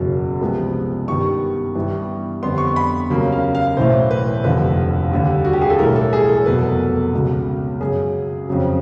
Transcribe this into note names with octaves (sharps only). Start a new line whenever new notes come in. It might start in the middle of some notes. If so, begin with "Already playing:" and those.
Already playing: F#1 E2 B2 F#3
C2 C3 F3 G#3 B3
G2 D#3 G3 B3 C#6
G2 E3 G3 B3
F2 D3 G3 B3 C6
C#6
C6
B5
D#2 C#3 F#3 A#3
F5
F5
B1 A2 E3 A3 C5
B4
F1 D#2 D3 F3 B4
D#2 D3 G3
F#4
G4
G#4
A4
B1 A2 E3 G3 A#4
A4
G#4
A#4
A4
F1 E2 B2 F#3 B4
A4
A#4
C#2 B2 G#3
F#2 C#3 F#3 G#4
F2 C#3 F#3